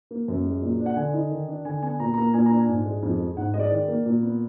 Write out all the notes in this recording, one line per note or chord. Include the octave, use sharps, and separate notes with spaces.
A#3
F#2
G#3
A#2
D4
F#5
D3 G#5
D#4
D#3
D4
D3 G#5
B3 G#5
A#2 A#5
A#3 A#5
A#2 G#5
A#5
D4
G#5
G#2
G#3
F2
G#3
G#2 F#5
G#3 D#5
D5
D#3 D5
A#3
A#2
B3